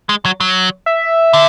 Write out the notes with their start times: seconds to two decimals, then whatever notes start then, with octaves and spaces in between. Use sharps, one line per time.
0.09 G#3
0.25 F#3
0.40 F#3
0.86 E5
1.33 D3